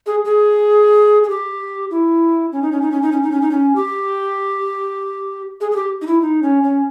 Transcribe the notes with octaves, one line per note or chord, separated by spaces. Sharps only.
G#4
G#4
G#4
G4
E4
C#4
D#4
C#4
D#4
C#4
D#4
C#4
D#4
C#4
D#4
C#4
G4
G#4
G#4
G4
D#4
E4
D#4
C#4
C#4